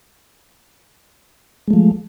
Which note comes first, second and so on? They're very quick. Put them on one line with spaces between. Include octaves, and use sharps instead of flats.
G#3 A3 F3